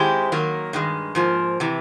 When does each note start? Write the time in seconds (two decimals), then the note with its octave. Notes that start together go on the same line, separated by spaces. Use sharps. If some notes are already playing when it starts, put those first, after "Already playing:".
Already playing: D#3 G#3 C4 E4 G4
0.32 D#3 F#3 A#3
0.73 G2 D#3 G#3
1.15 G#2 F3 A#3
1.60 C3 E3